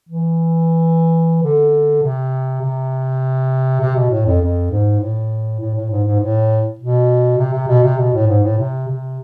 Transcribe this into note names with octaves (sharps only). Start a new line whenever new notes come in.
E3
D3
C3
C3
C3
B2
A2
F2
F2
G#2
A2
A2
A2
G#2
G#2
A2
B2
C3
C3
B2
C3
B2
A2
G#2
A2
C3
C3